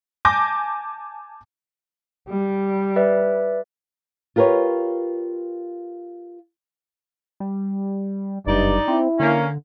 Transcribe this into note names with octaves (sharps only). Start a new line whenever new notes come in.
G#5 A5 D6 G6 A#6
G3
B4 D5 E5
F4 G4 A#4 B4 C#5
G3
F#1 G2 D#4 D5
C4 E4
D3 A#3 C#4